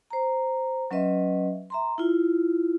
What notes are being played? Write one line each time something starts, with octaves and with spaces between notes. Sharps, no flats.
C5 A#5
F#3 C#4 B4 D#5 E5
E5 A#5 C6
E4 F4